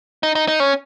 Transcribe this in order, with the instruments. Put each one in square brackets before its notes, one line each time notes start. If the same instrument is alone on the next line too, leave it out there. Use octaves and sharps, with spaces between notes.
[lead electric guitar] D#4
D#4
D#4
C#4